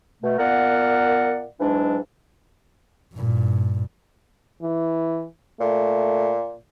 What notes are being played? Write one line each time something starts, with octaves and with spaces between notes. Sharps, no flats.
B2 A3
A#2 A#3 B3 A#4 D5 F#5
G#2 E3 F#3 G#3 D4
G2 A#2
E3
A#2 A3